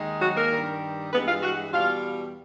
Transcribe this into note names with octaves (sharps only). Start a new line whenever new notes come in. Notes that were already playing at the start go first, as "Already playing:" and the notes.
Already playing: D#2 D#3 G#3
F#3 F#4
A#3 A#4
G2 D#3 G3
G2 E3 G#3 B3 B4
F4 F5
F#4 F#5
E2 B2 G3 F4 F5